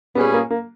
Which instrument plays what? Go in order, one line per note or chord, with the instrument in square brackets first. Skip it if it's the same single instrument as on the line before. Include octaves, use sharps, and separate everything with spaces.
[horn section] A#2 G3 C#4 G#4 B4 [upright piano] B3
[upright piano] A#3
A#3